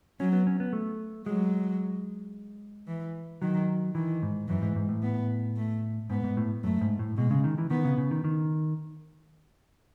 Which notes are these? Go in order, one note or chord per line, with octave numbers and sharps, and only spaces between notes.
F#3 C#4
B3
C#4
B3
A3
F#3 G#3
E3
D#3 F#3
D#3 E3
G#2
F#2 E3
G#2
G#2
A2
B3
A3
G#2 B3
G#2
A2
F#2 A3
G#2
A2
B2 G#3
C#3
D#3
E3
D#3 B3
C#3
C#3
D#3
D#3